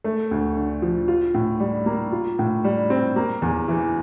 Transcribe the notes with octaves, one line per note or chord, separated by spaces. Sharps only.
A3
D2
D3
F3
F4
A2
G3
A#3
F4
A2
G3
C4
A#3
E2
E3